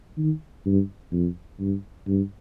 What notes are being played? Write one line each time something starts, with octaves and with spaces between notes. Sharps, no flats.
D#3
G2
F2
G2
G2